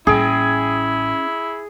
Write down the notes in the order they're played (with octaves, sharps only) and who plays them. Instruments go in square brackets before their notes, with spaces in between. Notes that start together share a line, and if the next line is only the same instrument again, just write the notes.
[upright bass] A1 G3 [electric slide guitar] C#4 G5 [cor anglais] E4 [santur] G#4